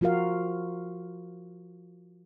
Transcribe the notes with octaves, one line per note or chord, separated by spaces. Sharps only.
F3 F4 F#4 A#4 F5